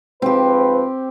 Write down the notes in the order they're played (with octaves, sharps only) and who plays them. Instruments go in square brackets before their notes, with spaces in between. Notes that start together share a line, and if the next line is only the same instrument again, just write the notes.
[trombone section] G#2 F3 B4 [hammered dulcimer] C4 G4